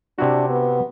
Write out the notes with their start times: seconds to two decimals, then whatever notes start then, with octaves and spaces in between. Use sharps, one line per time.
0.18 C3 D4 E4 F#4
0.49 B3